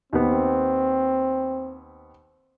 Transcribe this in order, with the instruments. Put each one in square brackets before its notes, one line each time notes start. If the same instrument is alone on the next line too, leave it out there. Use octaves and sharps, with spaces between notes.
[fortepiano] D#2 B3 [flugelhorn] C4